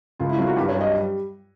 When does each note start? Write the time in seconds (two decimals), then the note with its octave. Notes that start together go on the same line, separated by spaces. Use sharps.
0.19 C#2 F4
0.29 E4
0.38 F#3 F4
0.47 F#4
0.56 G2 G4
0.68 C#5
0.75 G3
0.81 D#5